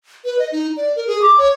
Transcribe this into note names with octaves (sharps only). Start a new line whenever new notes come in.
B4
D#5
D#4
D5
A#4
G#4
D6
C#5